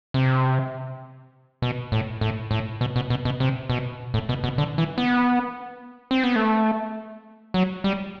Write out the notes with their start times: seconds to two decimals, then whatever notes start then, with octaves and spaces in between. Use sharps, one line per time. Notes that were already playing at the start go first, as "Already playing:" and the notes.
0.14 C3
1.62 B2
1.92 A2
2.21 A2
2.51 A2
2.81 B2
2.96 B2
3.10 B2
3.25 B2
3.40 C3
3.70 B2
4.14 A2
4.29 B2
4.44 B2
4.58 D3
4.78 E3
4.98 B3
6.11 C4
6.24 B3
6.36 A3
7.54 F#3
7.84 G3